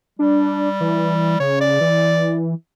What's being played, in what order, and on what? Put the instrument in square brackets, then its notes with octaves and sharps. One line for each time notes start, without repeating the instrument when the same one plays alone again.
[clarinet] G3 [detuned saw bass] D4
[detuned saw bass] E3
[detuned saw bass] C#3 [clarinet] C#5
[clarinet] D5
[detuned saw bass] E3